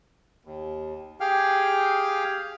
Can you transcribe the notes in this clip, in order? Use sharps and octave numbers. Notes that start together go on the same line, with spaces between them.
D#2
G4 G#4 F5 G5 F6